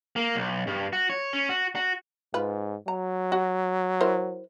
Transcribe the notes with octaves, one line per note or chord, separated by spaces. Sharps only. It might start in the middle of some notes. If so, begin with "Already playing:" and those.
A#3
B1
G2
F#4
C#5
C#4
F#4
F#4
G#2 F4 B4
F#3 A#5
F#4
E4 A#4 C5